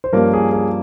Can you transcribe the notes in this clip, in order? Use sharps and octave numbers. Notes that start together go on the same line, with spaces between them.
C5
G2 F3 A#3 C#4 A#4
G#4
G#4